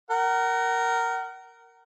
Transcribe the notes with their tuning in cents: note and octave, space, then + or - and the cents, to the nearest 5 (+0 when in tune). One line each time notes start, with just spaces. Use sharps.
A#4 -5 F#5 +35